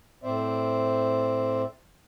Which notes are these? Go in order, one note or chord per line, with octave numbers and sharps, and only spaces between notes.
A2 C4 C5 D5 E5